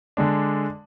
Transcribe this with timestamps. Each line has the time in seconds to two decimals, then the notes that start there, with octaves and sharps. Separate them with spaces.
0.17 D3 G#3 D4